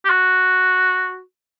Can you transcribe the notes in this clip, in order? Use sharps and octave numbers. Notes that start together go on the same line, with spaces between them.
G4
F#4